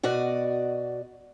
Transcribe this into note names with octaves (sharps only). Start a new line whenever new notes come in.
B2 F#4 D5 D#5